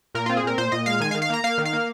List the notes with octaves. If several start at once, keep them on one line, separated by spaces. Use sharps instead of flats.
A#2 A#4
C4 F4
G#4
A#2 A#4
A#2 C5
A#2 D#5
G#3 F5
D#3 G#5
F5
D#3
F5
A#3 A#5
A#3 F5
D#3
F5
A#3